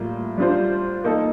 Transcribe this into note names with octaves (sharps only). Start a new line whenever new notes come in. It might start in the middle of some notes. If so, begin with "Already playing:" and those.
Already playing: A2 G3 A#3 F4
G3 D4 F4 C5
A#3 D#4 A4